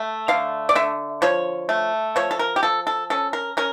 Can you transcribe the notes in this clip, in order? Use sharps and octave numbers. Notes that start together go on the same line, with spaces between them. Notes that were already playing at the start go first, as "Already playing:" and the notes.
Already playing: A3
D3 F5
D5
D3 E5
F3 C#5
A3
F3 C#5
A4
A#4
G4
F3 A4
A4
C#4 A4
A#4
C#4 A#4